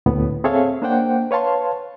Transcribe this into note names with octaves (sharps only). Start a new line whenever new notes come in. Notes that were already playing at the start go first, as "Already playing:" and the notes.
D2 A2 B3
C4 G#4 A4 C#5 E5 F5
A#3 D4 C5 F#5 G5
B4 C#5 F5 A5 C6